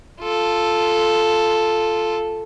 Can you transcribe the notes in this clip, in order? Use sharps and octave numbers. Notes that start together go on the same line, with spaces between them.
F4 A4